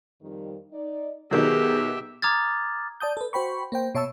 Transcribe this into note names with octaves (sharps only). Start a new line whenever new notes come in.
F2 D#3 G3
D#4 D5
B2 D#3 F#3 G4 G#4 E5
A#5 D6 D#6 F6 G#6 A6
D5 A5 D#6 G6
A4 B4
F#4 C5 G5 B5 C#6
A#3 C5 G5
B2 C#5 E5 A5 C#6 E6